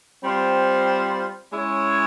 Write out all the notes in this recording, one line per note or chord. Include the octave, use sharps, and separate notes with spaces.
G3 C4 F4 C5
G#3 C#4 E4 G#4 C#5